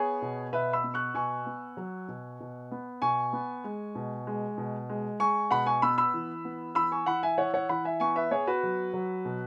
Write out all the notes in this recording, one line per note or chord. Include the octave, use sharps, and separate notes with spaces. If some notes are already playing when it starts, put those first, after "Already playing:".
Already playing: B3 G#4 C#5
B2
B2 B4 E5
B5 E6
B3
C#6 F#6
B2 G#5 C#6
B3
F#3
B2
B2
B3
B2 G#5 C#6
B3
G#3
B2
G#3
B2
G#3
G#3 G#5 C#6
B2 F#5 B5
G#5 C#6
B3 B5 E6
B5 E6
E3
B3
E3 B5 E6
G#5 C#6
E3 F#5 B5
E5 G#5
E3 C#5 F#5
C#5 F#5
E3 F#5 B5
E5 G#5
B3 G#5 C#6
B4 E5
B3 G#4 C#5
F#4 B4
F#3
F#3
B2